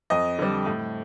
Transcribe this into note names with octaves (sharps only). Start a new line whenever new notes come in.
F2 D#5
D3 G3
A2